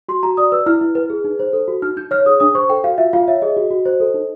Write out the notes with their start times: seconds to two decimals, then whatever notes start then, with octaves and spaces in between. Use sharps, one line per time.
0.08 F#4 C6
0.23 F#4 A#5
0.37 D5 D#6
0.52 B4 E6
0.66 E4 F6
0.81 E4
0.95 B4
1.10 G#4
1.24 D#4
1.39 C5
1.53 A4
1.68 F#4
1.82 D#4 F6
1.97 D#4 G6
2.11 C#5 F6
2.26 G#4 D#6
2.40 D4 D#6
2.55 C5 C#6
2.70 A4 G5
2.84 F#4 F5
2.98 F4 E5
3.13 F4 F5
3.28 C#5 E5
3.42 G#4 D#5
3.56 F#4
3.71 F#4
3.85 C5
4.00 A4
4.14 D#4